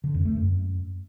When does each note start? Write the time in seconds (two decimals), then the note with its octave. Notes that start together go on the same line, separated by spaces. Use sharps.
0.04 D3
0.15 F2
0.25 A3
0.36 F#2